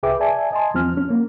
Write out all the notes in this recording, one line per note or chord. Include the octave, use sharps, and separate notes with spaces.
C2 G#4 B4 E5 G5 D6
D5 E5 G#5 A5
D#5 G#5 A5 C6
E2 F3 C4 F6
C#4
A#3